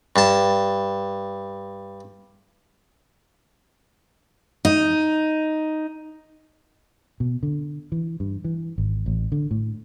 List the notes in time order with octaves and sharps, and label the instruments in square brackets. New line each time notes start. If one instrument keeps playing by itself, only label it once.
[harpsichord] G2 A5
[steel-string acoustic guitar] D#4
[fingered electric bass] B2
D3
E3
G2
E3
G#1
A1
D3
A2